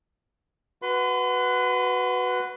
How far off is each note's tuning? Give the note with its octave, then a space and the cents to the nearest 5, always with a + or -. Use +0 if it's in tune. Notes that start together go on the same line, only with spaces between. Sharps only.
F#4 +0 B4 +0 C6 -45